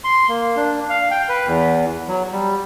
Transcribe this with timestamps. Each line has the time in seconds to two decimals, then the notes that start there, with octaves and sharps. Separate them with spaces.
0.04 C6
0.29 A#3
0.56 D4
0.90 F5
1.11 G5
1.29 B4
1.47 E2
2.08 F#3
2.32 G3